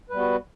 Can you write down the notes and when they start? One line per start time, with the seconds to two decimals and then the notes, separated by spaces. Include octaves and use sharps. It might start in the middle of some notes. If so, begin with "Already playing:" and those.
0.10 B4
0.13 G3
0.16 B3
0.19 F#4